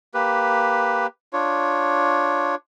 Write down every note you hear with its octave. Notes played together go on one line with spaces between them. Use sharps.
A#3 G4 B4
D4 F4 C#5